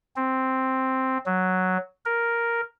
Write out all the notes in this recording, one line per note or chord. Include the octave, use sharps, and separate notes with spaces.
C4
F#3
A#4